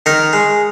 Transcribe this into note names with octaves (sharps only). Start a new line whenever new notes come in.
D#3 A#4
G#3